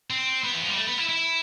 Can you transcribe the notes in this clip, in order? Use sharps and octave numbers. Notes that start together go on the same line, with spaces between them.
C4
B3
E3
F3
G3
A3
B3
E4
E4